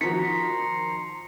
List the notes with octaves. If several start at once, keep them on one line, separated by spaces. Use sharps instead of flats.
D#3 F3 F#4 A#5 C6 B6 C#7